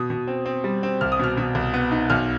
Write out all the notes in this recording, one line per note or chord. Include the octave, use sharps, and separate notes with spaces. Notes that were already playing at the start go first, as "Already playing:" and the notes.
Already playing: B2 D#6
B2
C4
C4
G3
C4
C2 F6
D#6
B2 F6
B2
C2
B3
D#4
B1 F6